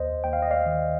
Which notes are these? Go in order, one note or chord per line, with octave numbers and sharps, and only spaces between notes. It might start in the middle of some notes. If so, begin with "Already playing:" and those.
Already playing: D#2 C5 D#5
D#2 G5
F5
D#5
D5 F5
D#3